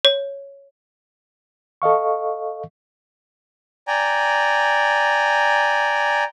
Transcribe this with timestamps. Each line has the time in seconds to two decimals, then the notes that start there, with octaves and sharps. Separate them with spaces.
0.05 C#5
1.82 A4 D#5 F5 C#6
3.87 D5 G5 G#5 A#5